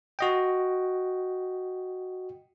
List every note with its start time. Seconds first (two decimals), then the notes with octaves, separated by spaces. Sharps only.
0.19 F#4 D#5 G5